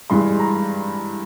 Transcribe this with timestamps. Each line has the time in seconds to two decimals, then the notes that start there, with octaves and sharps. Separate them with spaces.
0.10 G2 E3 G#3 C6
0.40 A#5